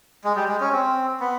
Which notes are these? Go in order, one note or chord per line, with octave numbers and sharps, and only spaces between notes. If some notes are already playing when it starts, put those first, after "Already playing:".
G#3
G3
G#3
C#4
C4
B3